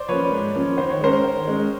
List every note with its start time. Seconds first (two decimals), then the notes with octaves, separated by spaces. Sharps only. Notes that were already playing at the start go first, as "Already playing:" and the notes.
Already playing: C5 D5
0.08 F3 A#3 C#4 B4 C#5
0.32 G#2
0.54 F3 A#3 C#4
0.77 D#3 C5
0.90 C#5
1.01 G#3 C#4 A#4 C5
1.24 D#3
1.47 G#3 C#4